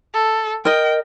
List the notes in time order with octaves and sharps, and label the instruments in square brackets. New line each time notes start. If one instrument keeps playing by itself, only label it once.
[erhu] A4
[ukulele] A#4 D#5 [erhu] G5